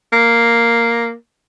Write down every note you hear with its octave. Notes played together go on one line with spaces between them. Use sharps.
A#3